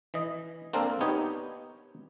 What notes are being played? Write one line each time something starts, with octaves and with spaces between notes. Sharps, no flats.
E3 D#5
A#3 C4 D4 A4 A#4 F5
B3 D#4 G4 C#5